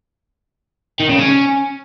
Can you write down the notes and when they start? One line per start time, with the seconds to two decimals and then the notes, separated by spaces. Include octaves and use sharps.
1.00 D#3
1.09 C#3
1.19 C#4